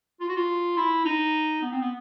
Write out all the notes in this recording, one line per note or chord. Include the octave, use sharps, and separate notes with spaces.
F4
F#4
F4
E4
D#4
B3
C4
B3